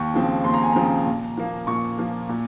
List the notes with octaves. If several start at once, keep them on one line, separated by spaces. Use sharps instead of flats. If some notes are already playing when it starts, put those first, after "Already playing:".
Already playing: D#2 C#6
C#3 F3 C4
D#2 C6
A#5
G#5
C#3 F3 C4 A#5
A#2
F3 A#3
A#2 C#6
F3 A#3
A#2